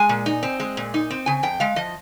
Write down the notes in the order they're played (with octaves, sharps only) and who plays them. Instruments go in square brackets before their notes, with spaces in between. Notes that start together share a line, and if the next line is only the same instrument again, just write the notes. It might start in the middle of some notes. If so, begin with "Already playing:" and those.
Already playing: [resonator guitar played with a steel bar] G#3 G#5
A#2
D#4
C4
G#3
A#2
D#4
C4
C#3 G#5
F2 G5
G#3 F5
F3 D#5